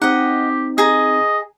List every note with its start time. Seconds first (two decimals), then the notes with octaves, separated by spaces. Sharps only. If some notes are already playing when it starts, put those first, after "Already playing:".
0.02 C4 D#4 G4 D#5 F#5
0.78 G#4 D#5 A#5